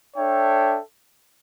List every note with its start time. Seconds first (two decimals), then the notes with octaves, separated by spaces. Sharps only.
0.16 D4 A4 C#5 E5 G5